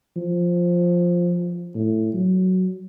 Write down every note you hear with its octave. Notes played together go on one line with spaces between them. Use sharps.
F3
A2
F#3